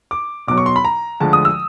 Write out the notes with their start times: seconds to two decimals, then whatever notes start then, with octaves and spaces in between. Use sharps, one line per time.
0.11 D6
0.47 B1 B2 F#3 D6
0.58 C#6
0.66 C6
0.76 B5
0.85 A#5
1.20 D2 D3 F3 G#3 A5
1.33 D#6
1.45 E6